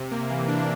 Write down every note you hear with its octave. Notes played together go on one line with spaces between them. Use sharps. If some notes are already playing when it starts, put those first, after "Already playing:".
Already playing: C3
A#3
E3
D4